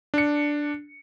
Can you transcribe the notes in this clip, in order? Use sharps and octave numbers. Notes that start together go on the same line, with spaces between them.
D4 C#7